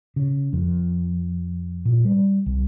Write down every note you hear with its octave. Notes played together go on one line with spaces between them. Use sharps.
C#3
F2
A#2
G3
C2